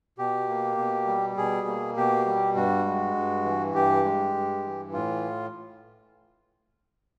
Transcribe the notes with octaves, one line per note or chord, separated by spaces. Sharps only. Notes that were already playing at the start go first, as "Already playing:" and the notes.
B2 G4
A#3
B2
G3
B2 G#4
A#3
B2 G4
G3
G2 F#4
G#3
G2
E3
G2 G4
G#3
G2
E3
A2 F4